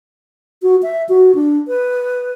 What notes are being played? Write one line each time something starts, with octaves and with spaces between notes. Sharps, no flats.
F#4
E5
F#4
D4
B4